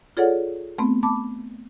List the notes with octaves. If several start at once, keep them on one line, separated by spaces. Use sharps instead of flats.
F4 G#4 A4 C#5 D5 F#5
A3 B3 C4
A5 B5 D6